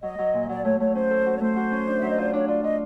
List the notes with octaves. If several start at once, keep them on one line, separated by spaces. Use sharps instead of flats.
F#3 D#5
F#3
A#2
F#3 D5
A3 C#5
A3 C#5
C#4 C5
A4
F#4
C#5
A3 C5
F#4
C#4
D4
F#3 E5
D#5
F4 D5
D4 C#5
F4 D5
F4 D#5